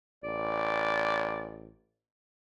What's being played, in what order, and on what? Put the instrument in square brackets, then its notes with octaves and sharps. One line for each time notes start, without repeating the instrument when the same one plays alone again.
[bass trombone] A1 [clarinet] D5